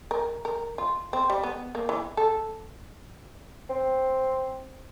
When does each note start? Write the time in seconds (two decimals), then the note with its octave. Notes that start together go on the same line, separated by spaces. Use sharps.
0.11 A#4
0.45 A#4
0.78 F4
1.13 C4
1.30 G3
1.44 B3
1.75 A#3
1.89 E3
2.17 A4
3.70 C4